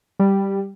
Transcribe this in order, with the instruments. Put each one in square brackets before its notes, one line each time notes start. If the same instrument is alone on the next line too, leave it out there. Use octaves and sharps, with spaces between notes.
[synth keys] G3